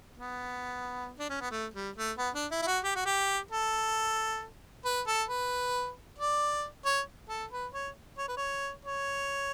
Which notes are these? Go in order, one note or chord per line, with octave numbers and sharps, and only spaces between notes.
B3
D4
C#4
B3
A3
G3
A3
B3
D4
E4
E4
F#4
G4
F#4
G4
A4
B4
A4
B4
D5
C#5
A4
B4
C#5
C#5
B4
C#5
C#5